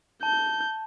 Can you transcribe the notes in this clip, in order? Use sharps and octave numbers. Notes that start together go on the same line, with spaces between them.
A5 G6